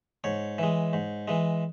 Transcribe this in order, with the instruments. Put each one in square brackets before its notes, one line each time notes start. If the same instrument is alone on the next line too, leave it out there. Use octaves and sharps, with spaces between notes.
[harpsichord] G#2 C#5
E3 G#3
G#2
E3 G#3